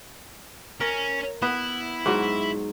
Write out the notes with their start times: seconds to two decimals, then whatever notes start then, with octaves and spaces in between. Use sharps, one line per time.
0.81 C#4 A#4
1.42 B3 E4
2.06 G#2 F#3